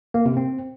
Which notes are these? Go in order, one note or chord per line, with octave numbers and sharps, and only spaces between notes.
A#3
C3
C4